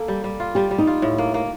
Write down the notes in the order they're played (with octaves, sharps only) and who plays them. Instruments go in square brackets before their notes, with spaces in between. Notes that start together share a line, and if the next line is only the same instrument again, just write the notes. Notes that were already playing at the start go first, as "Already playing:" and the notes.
Already playing: [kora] A#3 [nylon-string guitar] A4
[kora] G3
G3
F4
[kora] G3 [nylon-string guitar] G4
[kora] G3
[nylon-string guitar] D#4
[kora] F4
A2
A#3
A#3